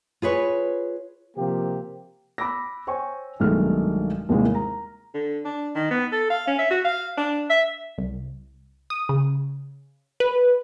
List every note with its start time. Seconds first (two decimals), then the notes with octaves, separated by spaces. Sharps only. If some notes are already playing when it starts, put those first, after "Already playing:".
0.22 F4 G#4 B4 C#5
1.37 C3 F3 A#3 C4 G4
2.38 B5 D6 E6 A#6
2.87 C5 C#5 G5 G#5 C#6
3.40 B1 G2 D#3 G#3 A3 F6
4.29 D#2 C3 E3 G3 G#3 A#3
4.55 A#5
5.14 D3
5.45 D4
5.75 D#3
5.91 B3
6.12 A4
6.30 F5
6.47 C#4
6.59 E5
6.71 F#4
6.84 F5
7.17 D4
7.50 E5
7.98 C2
8.90 D#6
9.09 C#3
10.20 B4